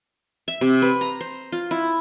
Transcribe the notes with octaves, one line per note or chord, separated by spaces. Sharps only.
E5
C3
B4
A#5
C5
F4
E4